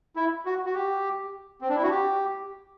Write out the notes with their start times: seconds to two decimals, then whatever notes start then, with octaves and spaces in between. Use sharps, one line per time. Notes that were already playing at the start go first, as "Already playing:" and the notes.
0.16 E4
0.46 F#4
0.66 F#4
0.74 G4
1.61 C4
1.69 D4
1.76 E4
1.83 F#4
1.91 G4